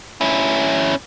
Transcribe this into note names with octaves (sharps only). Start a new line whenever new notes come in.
C#4 E4